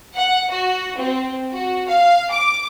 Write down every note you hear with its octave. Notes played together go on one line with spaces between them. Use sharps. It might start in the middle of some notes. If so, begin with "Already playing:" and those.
F#5
F#4
C4
F#4
F5
D6